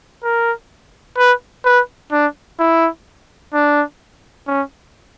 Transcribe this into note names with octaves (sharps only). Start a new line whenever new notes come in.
A#4
B4
B4
D4
E4
D4
C#4